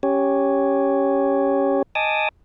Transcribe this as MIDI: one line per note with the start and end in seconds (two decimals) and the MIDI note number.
0.03 1.82 61
0.03 1.82 67
0.03 1.82 73
1.95 2.29 75
1.95 2.29 80
1.95 2.29 81
1.95 2.29 86
1.95 2.29 87